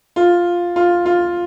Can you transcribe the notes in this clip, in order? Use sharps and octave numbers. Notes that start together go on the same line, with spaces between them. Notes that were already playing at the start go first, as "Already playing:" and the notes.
F4
F4
F4